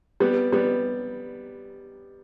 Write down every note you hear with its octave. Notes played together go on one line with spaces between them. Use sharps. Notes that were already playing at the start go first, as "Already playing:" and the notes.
G3 B3
G3 B3